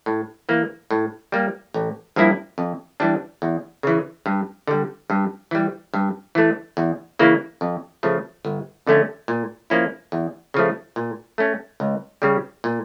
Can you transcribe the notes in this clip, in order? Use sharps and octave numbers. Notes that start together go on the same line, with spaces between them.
A2
E3 A#3
A2
G3 A#3
A1
G2 F3 A#3 E4
F2
E3 G3 D4
E2
C#3 E3
G2
D3 G3
G2
E3 G3
G2
E3 A3
E2
C#3 E3 A#3 E4
F2
C#3 F3 A3
G1
F2 D3 A3 C#4
A#2
F3 A#3 C#4 E4
E2
C#3 F3 A3
A#2
A3 C#4
C#2
C#3 G3
A#2